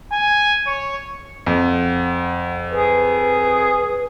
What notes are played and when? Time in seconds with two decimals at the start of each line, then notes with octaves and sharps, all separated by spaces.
0.12 G#5
0.67 C#5
1.47 F2 F#5
2.70 G#4 B4